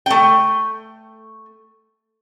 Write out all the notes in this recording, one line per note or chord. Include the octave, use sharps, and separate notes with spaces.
A3 G5